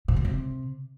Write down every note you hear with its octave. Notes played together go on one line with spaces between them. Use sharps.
B2
A2
C3